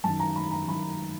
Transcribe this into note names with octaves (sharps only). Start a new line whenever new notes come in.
F#2 D#3 A5
A#5
B5
A#5
F#2 D#3 B5